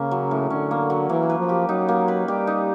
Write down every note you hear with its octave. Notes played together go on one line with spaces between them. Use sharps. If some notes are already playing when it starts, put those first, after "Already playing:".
Already playing: C#3 A#3 C#4
F#3
A2
D3 C#4
A#3
F#3
E3 A#3
B4
F3
G4
F#3 D#4
A#3
B4
G3 G4
D#4